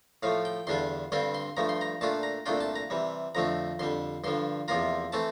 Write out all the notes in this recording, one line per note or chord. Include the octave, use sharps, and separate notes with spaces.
A2 F3 A3 F5
G5
E2 D3 G3 D4 F4 C6
G2 D3 G3 C4 F4 C6
C6
G2 F3 A3 A#5
C6
A#5
A#2 A3 D4 F4 A5
A#5
C2 A#2 A3 D4 F4 G5
A5
A#5
C3 E3 G3
F2 D3 F3 A3 C4 A#5
F2 D3 G3 C6
G2 D3 F3 C6
E2 C3 F3 A#3 F4 A#5
E3 A3 C4 A5